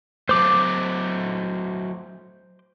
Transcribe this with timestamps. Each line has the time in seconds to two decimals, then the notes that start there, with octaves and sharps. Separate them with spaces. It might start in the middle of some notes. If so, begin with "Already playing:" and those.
0.29 F#3 A3 C5 D6